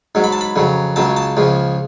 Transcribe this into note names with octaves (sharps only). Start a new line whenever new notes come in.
G#2 F#3
B5
A5
B5
F2 C#3 F#3
C#2 C#3 F#3 A5
A5
C#2 C#3 F3